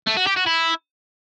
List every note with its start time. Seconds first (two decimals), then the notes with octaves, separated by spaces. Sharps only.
0.07 A3
0.17 F#4
0.26 G4
0.36 F#4
0.46 E4